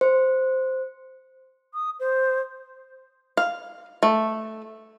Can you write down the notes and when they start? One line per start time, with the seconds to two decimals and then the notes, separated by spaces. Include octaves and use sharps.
0.01 C5
1.74 D#6
2.00 C5
3.37 F5
4.03 A3